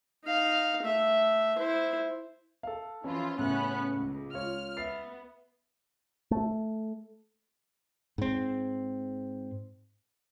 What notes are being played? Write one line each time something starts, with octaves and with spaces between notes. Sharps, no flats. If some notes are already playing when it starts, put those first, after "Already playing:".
D#4 F5
A3 E5
E4 C5
A4 F5
E3 F3 C#4 F4
A2 C#3 A3 B3 C#4 F#6
C#2
F4 C#5 F6
B3 E5 A6 C7
A3
G#2 C4